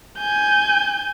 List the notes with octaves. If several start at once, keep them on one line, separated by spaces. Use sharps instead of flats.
G#5 G6